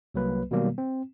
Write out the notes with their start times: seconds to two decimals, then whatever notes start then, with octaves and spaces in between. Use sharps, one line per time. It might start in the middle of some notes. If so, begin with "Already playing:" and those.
0.14 C2 F#3 A#3 B4
0.51 B2 D#3 F#3 G3 A#3
0.78 C4